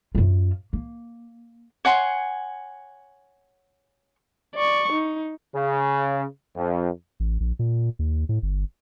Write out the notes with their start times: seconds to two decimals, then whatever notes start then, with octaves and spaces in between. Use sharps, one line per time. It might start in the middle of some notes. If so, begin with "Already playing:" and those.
0.15 F#2 F4
0.73 A#3
1.85 C#5 F#5 G#5 C6
4.56 D5 C#6
4.92 D#4
5.54 C#3
6.55 F2
7.20 A1
7.40 A#1
7.59 A#2
7.99 D#2
8.29 A2
8.42 G1